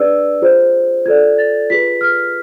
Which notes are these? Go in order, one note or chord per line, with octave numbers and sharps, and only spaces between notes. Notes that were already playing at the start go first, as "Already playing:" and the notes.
Already playing: D4 G#4 B4 D5 E6
F4 G#4 C5
F4 A4 D5 G#6
A6
F4 G#4 B4 B6
F6